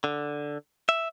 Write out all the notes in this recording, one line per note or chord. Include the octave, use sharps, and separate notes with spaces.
D3
E5